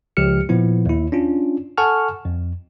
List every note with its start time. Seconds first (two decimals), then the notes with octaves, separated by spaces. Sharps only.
0.17 C#2 F3 G4 F6 C#7
0.49 A#2 F3 B3 E4
0.86 D#2 E4
1.12 C#4 D4 F4
1.78 A4 F#5 G#5 A5 C#6 F6
2.25 F2